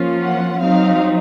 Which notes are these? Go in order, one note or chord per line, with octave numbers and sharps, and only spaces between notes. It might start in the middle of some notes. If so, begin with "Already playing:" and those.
Already playing: F3 A#3 C#4 F4
F#5
F#3 C4 D#4 F5